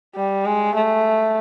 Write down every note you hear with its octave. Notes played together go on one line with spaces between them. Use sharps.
G3
G#3
A3